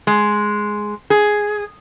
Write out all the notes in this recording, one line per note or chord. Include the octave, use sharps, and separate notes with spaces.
G#3
G#4